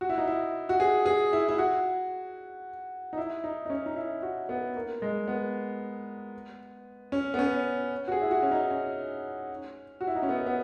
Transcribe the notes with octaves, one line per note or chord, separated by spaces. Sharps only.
F#4
E4
D#4
E4
F#4
G#4
G#4
E4
E4
F#4
D#4
E4
D#4
D#4
C#4
D#4
E4
F#4
B3
A#3
G#3
B3
C#4
B3
C#4
F#4
G#4
E4
F#4
C#4
D#4
C#4
F#4
E4
D#4
C#4
B3
B3